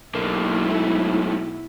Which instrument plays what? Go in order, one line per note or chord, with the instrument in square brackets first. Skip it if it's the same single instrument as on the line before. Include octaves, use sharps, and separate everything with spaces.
[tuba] B1 [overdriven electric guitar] D3 A#3 [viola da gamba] E4
[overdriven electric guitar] G#2 A3